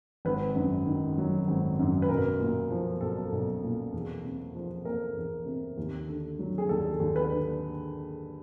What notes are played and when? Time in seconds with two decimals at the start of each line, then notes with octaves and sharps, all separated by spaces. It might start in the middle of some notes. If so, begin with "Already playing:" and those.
0.25 G#1 B4
0.56 F#2
0.86 D#3
1.18 F#3
1.48 G#1
1.79 F#2
2.02 B4
2.09 B1 A#4
2.40 A#2
2.70 F3
3.01 B1 A4
3.32 B1
3.63 A#2
3.93 E2
4.23 C3
4.55 F3
4.85 A#3 A#4
5.16 E2
5.46 C3
5.77 D#2
6.08 D3
6.39 F#3
6.58 G#4
6.69 D#2 A4
7.00 D#2
7.16 B4
7.30 D3